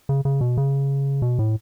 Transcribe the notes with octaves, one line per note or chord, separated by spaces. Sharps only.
C#3
C#3
B2
C#3
B2
A2